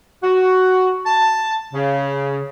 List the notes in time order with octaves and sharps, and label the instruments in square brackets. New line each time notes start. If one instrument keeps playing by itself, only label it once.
[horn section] F#4
A5
C#3